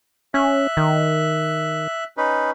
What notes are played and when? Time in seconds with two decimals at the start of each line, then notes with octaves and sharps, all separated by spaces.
0.34 C#4 E5 F#6
0.77 D#3
2.17 C#4 D#4 B4